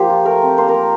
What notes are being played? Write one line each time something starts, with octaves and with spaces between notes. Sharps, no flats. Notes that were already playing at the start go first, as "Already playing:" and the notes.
Already playing: F3 A#3 G4 C5
F4
A3 A#4
C4
A#3 C5
A#4
A#3